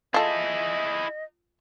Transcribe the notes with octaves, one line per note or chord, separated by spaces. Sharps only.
E4 F4 G#4 A4 D#5